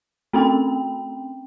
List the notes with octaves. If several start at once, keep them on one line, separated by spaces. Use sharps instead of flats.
A3 C4 C#4 G5